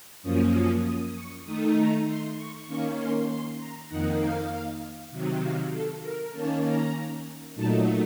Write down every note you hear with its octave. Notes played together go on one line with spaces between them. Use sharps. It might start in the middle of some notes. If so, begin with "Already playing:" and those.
F#2 F3 A#3 C#4 D#6
D#6
D#6
C#6
D#3 A3 D#4 D#6
A#5
C6
C#6
D#3 A#3 C#4 C#6
C6
C6
A#5
F2 D#3 A#3 D#4 F#5
F5
C3 D#3 F#3
F5
A4
A#4
D#3 A#3 C#4 A5
A#5
A#2 F#3 A3 D#4 A5